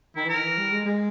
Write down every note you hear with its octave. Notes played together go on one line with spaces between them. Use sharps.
D#3 E4
E3
A#4
D#3
E3
G3
G#3
G#3